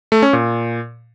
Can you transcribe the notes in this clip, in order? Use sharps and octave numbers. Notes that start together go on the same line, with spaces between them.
A3
C#4
A#2